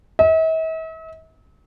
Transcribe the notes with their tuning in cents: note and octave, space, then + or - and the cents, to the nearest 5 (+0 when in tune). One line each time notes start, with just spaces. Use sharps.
E5 -45